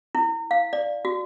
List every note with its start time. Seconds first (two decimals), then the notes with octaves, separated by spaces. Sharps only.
0.15 E4
0.51 F5
0.73 D5
1.05 F#4